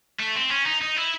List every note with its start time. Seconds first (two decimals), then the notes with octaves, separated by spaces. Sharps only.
0.20 A3
0.36 C4
0.50 C#4
0.66 D#4
0.82 D#4
0.97 E4